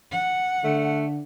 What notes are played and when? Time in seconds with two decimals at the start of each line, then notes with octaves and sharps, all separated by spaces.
0.12 F#5
0.64 D3 A3